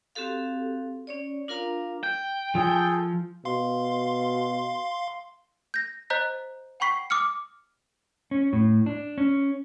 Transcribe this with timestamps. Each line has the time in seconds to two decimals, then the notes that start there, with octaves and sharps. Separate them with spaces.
0.15 C4 F#4 G4 A4 F5
1.07 C#4 C#5 D5
1.48 D4 F4 A#4 F5 A#5
2.03 G5
2.55 F3 G#4 A4
3.45 B2 F5 C6
5.74 G6 A#6
6.10 C5 D#5 A#5 F#6 G6 B6
6.80 F#5 G5 B5 C#6 B6 C7
7.10 D6 D#6 F6 C#7
8.31 C#4
8.53 A2
8.86 D4
9.18 C#4